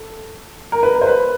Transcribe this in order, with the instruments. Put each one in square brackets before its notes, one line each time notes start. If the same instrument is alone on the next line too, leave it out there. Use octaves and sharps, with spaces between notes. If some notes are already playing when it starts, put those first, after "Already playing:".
Already playing: [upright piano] A4
A#4
B4
A#4
C5
B4